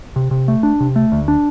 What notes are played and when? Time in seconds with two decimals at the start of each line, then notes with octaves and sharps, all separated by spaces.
0.16 C3
0.31 C3
0.48 A3
0.63 D4
0.80 C3
0.96 A3
1.12 D2
1.28 D4